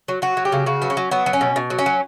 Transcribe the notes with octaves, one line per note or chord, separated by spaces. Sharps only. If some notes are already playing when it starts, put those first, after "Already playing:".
F#3
F#3 F#4
F#3
G4
C#3
C#3 F#4
F#3 B3
C#4
F#3
F#3 B3
F#3
C#4
B2
B2
F#3
C#4
F#3